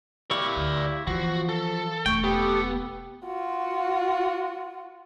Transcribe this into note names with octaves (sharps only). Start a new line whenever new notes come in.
E4 G4 D5 F5 C#6
D2
E3 F3 B3 F#4
A4
E1 A3 G5 C#6
B3 G4 A4
F4 F#4